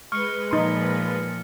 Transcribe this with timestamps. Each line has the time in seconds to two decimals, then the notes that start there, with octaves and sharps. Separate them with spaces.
0.12 G#3 B4 C#6 F6 C#7
0.51 A#2 F3 D#4 C6